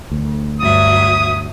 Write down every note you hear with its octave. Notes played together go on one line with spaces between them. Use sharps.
D2
G2 F#3 E5 D#6